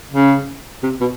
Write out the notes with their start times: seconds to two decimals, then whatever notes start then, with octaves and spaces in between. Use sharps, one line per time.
0.11 C#3
0.83 C3
1.01 B2